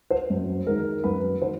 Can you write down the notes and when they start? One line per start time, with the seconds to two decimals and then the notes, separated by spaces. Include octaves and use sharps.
0.11 C5
0.30 F#2
0.66 D#3 G#3 A#4
1.04 F#2 B4
1.42 D#3 C5